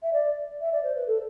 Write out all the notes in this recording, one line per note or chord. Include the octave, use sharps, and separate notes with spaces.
E5
D5
E5
D5
C5
B4
A4